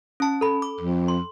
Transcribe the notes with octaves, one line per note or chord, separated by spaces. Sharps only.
C#4 A5
A4 B5
D6
F2
C6